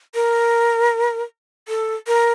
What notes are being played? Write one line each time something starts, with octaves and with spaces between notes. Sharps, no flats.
A#4
A4
A#4